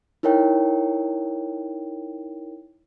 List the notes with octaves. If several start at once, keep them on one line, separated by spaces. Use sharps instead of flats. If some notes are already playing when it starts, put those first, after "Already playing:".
D#4 E4 A#4 C#5 G5